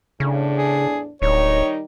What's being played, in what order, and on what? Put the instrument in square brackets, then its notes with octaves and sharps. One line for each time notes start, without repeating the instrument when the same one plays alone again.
[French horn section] E2 A2 D4 [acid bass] C#3
[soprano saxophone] G#4
[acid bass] D1 [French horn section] D#3 G3 D#4 [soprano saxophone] C#5